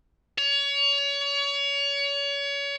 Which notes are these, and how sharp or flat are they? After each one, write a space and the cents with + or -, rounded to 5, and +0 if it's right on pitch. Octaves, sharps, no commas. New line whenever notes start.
C#5 +30